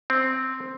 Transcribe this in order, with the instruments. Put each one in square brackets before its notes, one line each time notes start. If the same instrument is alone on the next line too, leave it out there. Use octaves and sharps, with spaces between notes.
[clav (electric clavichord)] C4